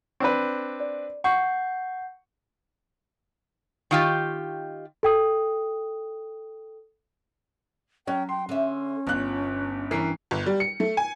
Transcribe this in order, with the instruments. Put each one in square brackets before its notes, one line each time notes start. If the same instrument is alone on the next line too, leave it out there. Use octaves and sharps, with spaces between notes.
[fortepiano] C4 D4 B4
[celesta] D5
[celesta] F#5 G6 C7 [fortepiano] C#6
[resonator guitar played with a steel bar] D#3 F4 G4
[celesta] A4 G5 D#6
[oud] F#3 [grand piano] C#4 [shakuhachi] G5
[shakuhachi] G5 [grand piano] C6
[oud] D3 E5 [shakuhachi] C#4
[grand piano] G1 F#6 [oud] G2 F4
[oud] G2 C#5 [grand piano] E3 A#4 C7
[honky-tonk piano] G1
G3
C#7
A3
G#5